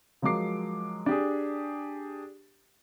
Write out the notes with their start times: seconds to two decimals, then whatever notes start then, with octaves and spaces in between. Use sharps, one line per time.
0.22 F3 F#3 G#3 A#4 D6 C7
1.06 D4 G4 G#4